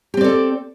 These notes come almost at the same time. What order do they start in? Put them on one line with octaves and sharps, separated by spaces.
G4 C4 D5 A4